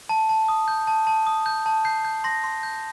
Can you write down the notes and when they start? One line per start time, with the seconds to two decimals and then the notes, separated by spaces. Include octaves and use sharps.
0.09 A5
0.29 A5
0.49 D#6
0.68 G6
0.87 A5
1.07 A5
1.27 D#6
1.46 G6
1.66 A5
1.85 G6 C7
2.05 G6
2.24 C6 A#6
2.44 C6
2.63 G6